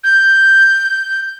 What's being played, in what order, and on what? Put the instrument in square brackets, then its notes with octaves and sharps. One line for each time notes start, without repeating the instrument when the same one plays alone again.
[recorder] G6